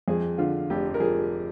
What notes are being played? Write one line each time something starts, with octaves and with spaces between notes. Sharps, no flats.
F2 G#4
D3 F4
F1 G4
A#4
F3 G#4